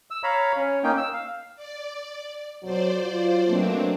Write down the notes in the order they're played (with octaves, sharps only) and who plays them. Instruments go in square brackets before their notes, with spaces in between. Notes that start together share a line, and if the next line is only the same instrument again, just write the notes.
[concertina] E6
C#5 F5 A#5 B5
C#4 C#5
A#3 C#4 D#4 G5
E6
F5
[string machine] D5
[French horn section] F2 B2 F#3 [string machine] C5 D5
[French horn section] F#3 F4
[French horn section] B2 A3 A#3 [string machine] F#3 C4 D4